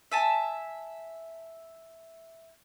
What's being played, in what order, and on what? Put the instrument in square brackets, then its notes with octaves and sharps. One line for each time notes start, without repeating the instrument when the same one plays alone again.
[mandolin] E5 G#5 A5